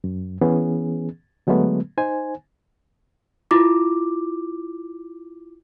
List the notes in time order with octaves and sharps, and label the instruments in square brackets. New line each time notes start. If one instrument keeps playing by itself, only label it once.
[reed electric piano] F#2
E3 B3 C#4 G#4
D3 F#3 G#3 A3 B3
D#4 C5 G#5
[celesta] E4 F4 D6